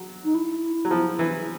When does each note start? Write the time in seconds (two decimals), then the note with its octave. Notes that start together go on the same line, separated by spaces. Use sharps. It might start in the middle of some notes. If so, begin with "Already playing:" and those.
Already playing: F#3
0.24 D#4
0.35 E4
0.85 F#3
0.91 F3
1.19 E3